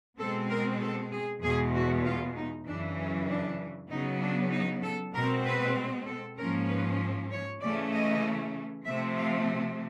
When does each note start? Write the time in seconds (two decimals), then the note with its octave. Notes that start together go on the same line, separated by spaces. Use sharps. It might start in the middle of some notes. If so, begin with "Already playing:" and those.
0.19 B2 G#3 C4 A4
0.50 A#4
0.81 A4
1.12 G#4
1.43 E2 B2 G#3 G#4
1.74 F#4
2.05 F4
2.36 D#4
2.67 F#2 C#3 E3 D4
2.97 C#4
3.29 D4
3.90 C#3 F#3 B3 D#4
4.22 D4
4.52 D#4
4.83 A4
5.14 B2 G#3 C4 A#4
5.45 B4
6.07 A4
6.38 G#2 F3 A#3 C#4 A#4
6.69 B4
7.31 C#5
7.62 C#3 E3 A3 C#4 D5
7.92 D#5
8.85 C3 F3 A3 C4 E5
9.17 F5